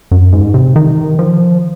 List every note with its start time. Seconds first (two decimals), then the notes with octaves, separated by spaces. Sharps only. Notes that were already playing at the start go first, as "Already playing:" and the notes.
0.11 F#2
0.33 G#2
0.54 C3
0.76 D#3
1.19 F3